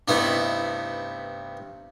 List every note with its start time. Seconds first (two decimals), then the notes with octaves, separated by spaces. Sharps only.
0.08 G2 C3 A3 B3 D#4 E4